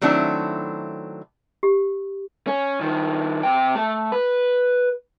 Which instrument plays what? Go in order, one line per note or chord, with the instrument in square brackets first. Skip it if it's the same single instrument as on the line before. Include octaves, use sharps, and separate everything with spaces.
[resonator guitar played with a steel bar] D#3 F#3 A3 C4 D4 E4
[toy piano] G4
[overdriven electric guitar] C#4
D#3 F3
C3 G5
A3
B4